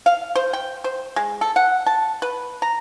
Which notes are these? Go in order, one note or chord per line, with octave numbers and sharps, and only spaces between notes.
F5
C5
G5
C5
G#3
A4
F#5
A5
B4
A#5